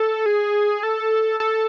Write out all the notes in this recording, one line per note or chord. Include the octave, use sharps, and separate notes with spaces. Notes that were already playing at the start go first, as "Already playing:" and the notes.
Already playing: A4
G#4
A4
A4